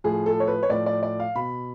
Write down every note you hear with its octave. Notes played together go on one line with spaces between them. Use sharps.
A2 F3 G#4
A4
C#5
B4
C#5
A2 F3 D5
D5
D5
F5
B2 B5